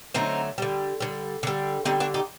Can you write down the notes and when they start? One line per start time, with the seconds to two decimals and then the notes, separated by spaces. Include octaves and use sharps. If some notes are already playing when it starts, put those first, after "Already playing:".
0.14 D3 F#3 A3 C4 D#4
0.58 D3 G3
1.00 D3 G3
1.43 D3 G3
1.85 D3 G3 C4 D#4
2.00 D4 F#4
2.14 D#4 G4